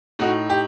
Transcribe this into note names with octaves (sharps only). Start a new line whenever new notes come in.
A2 A3 D#4 F#4
G4